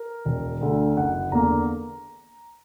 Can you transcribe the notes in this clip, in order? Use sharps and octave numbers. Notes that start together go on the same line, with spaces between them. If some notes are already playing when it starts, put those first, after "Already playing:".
Already playing: A#4
E1
D2 D3
F#1 F#5
E2 D3 A#3 A#5